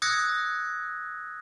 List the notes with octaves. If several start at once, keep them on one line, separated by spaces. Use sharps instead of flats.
D#6 E6 F#6 G#6 A#6 C#7